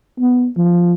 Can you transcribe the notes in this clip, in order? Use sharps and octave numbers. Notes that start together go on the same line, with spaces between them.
B3
F3